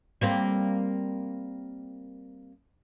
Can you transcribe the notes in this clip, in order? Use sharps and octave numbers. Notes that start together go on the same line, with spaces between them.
G3 A#3 C4